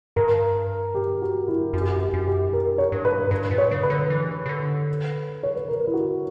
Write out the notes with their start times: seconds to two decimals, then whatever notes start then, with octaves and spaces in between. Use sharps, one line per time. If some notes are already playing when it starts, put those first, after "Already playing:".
0.16 G2 A#4
0.95 G4
1.22 F#4
1.48 E4
1.73 F#2 F#4
1.81 G4
1.88 F#4
2.01 F#4
2.14 F#2
2.27 G4
2.53 A#4
2.78 C#5
2.92 G2
3.05 B4
3.31 G2 B4
3.51 A#2
3.58 C#5
3.71 C#3
3.83 B4
3.90 D3
4.10 E3
4.46 C#3
4.49 D3
5.43 C#5
5.56 B4
5.68 A#4
5.87 E4
5.94 F#4